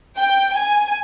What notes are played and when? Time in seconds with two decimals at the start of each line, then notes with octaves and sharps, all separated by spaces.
0.17 G5
0.56 G#5